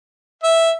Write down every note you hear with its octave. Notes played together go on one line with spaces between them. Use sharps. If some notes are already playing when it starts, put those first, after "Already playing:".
E5